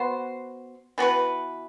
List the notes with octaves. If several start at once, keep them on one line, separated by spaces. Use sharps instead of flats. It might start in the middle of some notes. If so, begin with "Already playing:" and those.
Already playing: B3 F#4 C5
E3 B3 F#4 B4